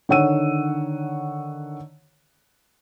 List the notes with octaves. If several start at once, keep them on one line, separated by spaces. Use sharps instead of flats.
D3 D#3 C#5 F#5 E6 D#7